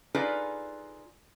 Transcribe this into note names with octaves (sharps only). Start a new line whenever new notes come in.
D#4 F4 G#4 A4 B4 D5